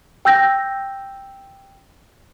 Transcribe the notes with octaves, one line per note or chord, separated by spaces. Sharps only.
G5 E6 G6 A#6